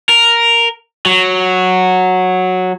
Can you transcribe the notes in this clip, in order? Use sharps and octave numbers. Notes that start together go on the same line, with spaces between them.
A#4
F#3